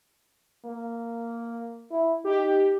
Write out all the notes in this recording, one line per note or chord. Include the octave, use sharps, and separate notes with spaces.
A#3
E4
D#4 G4